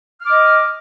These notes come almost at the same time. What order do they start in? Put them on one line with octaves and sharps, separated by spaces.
F6 D6 D#5